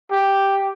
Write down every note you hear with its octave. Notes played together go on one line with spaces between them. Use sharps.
G4